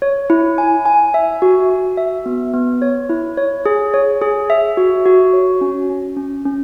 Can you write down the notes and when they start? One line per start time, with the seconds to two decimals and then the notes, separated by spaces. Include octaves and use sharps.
0.02 C#5
0.30 E4
0.58 G#5
0.85 G#5
1.14 E5
1.42 F#4
1.70 F#4
1.97 E5
2.26 B3
2.54 B3
2.82 C#5
3.09 E4
3.37 C#5
3.66 G#4
3.94 C#5
4.22 G#4
4.50 E5
4.77 F#4
5.06 F#4
5.33 C#5
5.61 C#4
5.90 C#4
6.17 C#4
6.46 C#4